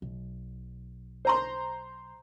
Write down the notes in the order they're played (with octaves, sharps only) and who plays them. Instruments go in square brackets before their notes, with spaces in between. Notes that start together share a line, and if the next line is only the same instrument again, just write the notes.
[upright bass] B1
[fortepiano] C5 A#5 C6